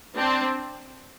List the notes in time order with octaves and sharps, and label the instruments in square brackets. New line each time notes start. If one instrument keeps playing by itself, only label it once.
[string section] C4 D4